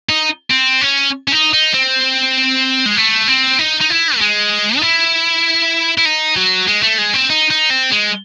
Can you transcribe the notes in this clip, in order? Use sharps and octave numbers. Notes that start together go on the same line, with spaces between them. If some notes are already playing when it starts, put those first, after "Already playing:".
D#4
C4
C#4
C#4
D#4
D#4
C4
G#3
A3
C4
D#4
D#4
E4
A3
G#3
D#4
E4
E4
D#4
F#3
G#3
A3
G#3
C4
D#4
D#4
C4
G#3